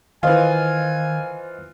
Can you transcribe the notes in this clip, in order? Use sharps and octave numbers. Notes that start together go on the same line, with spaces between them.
D#3 E3 F4 C5 D#5 F5 G#5